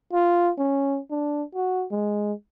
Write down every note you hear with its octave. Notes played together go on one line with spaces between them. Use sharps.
F4
C#4
D4
F#4
G#3